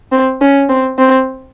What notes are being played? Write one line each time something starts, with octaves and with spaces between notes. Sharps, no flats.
C4
C#4
C4
C4